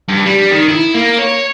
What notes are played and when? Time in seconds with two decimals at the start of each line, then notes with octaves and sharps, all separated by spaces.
0.09 G2
0.26 G3
0.51 D#3
0.69 E4
0.95 A#3
1.19 C#5